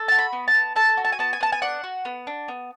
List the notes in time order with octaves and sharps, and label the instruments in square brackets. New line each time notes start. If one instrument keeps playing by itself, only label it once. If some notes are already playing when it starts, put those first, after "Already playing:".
Already playing: [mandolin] A4
F#4 A5
B5
B3
A5
B3
A4 A5
F#4
A5
G#5
B3 A5
G#5
B3 A5
G#5
D4 F#5
F#4
B3
D4
B3